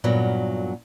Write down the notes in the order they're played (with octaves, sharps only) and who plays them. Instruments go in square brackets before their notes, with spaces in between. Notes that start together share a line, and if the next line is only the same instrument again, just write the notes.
[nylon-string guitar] G2 A#2 F#3 A#3 B3